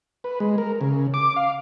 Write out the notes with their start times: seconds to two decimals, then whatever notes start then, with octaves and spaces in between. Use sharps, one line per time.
0.24 B4
0.40 G#3
0.58 A#4
0.81 C#3
1.14 D6
1.36 F5